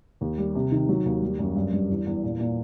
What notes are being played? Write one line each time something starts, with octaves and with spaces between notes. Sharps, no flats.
D#2
G3
C3
D#3
F#3
D#2
G3
F#2
G2
G2
E2
E2
A#2
A#2